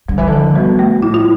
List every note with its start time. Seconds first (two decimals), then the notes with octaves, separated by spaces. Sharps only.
0.08 D3 G3
0.18 E3
0.27 D3
0.32 F3
0.55 B2 G3
0.79 A3
1.02 A2 E4
1.14 F4